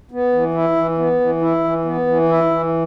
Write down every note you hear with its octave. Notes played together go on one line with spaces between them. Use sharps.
B3
E3
E4
E3
B3
E3
E4
E3
B3
E3
E4
E3